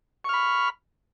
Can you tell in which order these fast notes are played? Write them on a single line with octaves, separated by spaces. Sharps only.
C#6 F6 B5